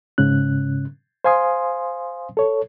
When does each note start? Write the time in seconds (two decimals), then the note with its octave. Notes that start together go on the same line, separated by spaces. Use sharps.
0.18 G#2 C#3 C#4 F#6
1.24 C5 F5 G#5 C6 D#6
2.37 A4 C#5